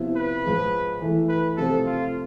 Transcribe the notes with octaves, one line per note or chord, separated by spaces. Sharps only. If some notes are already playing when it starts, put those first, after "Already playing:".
Already playing: C3 F3 B3 E4
B4
G#2 F3 G#3
E3 A3 E4
B4
C3 F3 A3 C4 A4
F4